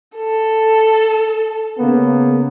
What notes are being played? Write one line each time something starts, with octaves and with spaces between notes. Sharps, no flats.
A4
C#3 A#3 B3